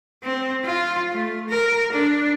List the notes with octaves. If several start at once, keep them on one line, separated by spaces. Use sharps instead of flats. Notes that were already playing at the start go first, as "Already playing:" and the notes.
C4
F4
A3
A#4
D4